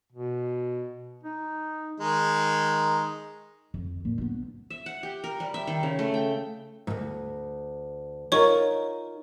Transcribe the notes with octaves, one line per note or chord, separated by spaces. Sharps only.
B2
D#4
D#3 G#3 D#4
F2
A#2
B3 D4
E5
F#5
G4
A#4
G3
E5
D#3
C#3
A3
G5
D2 G#2
D#4 F4 A#4 C#5 C#6